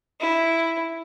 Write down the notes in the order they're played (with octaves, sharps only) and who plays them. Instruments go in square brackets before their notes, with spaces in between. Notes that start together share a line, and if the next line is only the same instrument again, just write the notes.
[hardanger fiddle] E4